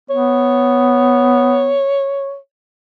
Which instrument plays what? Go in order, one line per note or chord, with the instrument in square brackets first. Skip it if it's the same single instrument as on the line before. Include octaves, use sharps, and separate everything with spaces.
[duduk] B3 [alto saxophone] C#5